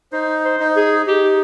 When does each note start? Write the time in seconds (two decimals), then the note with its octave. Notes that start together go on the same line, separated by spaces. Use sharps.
0.13 D#4 C5
0.45 C5
0.60 D#4
0.76 G#4
1.06 D#4 G4